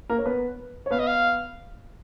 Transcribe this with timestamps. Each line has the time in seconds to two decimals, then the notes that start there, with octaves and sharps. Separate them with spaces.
0.10 A#3 A#4
0.18 C#5
0.26 B3 B4
0.86 C#5
0.91 B3 B4 F5
0.99 D#5
1.07 F5